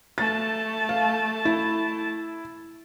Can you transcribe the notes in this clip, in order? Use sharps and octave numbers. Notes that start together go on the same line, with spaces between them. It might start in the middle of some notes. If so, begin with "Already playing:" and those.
A3 A5 A6
F5
E4